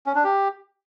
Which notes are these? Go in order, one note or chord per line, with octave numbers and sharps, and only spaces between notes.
C#4
D4
G4